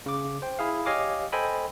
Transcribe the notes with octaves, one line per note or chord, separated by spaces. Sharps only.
C#3 D6
C5 G5
E4 G#4 F5
G4 C#5 D#5 F5 G#5 D6
A4 C5 D#5 G5 G#5 B5